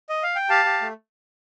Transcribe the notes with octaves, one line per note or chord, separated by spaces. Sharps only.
D#5
F5
G5
G4 F5 A5
G4
A3